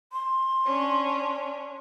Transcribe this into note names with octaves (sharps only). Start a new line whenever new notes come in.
C6
C#4 D4